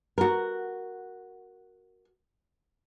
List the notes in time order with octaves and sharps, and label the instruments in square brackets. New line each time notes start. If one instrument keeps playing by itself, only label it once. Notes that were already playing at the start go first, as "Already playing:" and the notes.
[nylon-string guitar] F#4 A#4